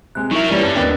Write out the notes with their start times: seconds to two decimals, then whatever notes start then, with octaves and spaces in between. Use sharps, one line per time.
0.15 C3 G#3 F#6
0.31 F#3 D#4 E4 A#4 E5 C#6
0.51 D3 E3 G3 C#4 D5 A#5 B6
0.63 G2
0.75 D#2 B3 D4 G5